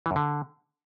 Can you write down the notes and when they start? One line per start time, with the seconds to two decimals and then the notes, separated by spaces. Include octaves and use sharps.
0.06 E3
0.11 F#2
0.16 D3